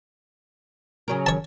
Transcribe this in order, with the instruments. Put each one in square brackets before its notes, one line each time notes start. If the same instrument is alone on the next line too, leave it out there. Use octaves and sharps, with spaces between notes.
[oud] C#3 F#3 A#4
[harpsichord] C#5 A5